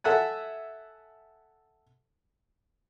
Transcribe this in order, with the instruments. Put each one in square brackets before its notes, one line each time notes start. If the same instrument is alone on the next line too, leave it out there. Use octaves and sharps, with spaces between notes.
[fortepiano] A4 E5 F#5 G#5